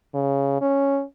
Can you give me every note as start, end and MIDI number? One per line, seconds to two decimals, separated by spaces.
0.14 0.58 49
0.61 1.02 61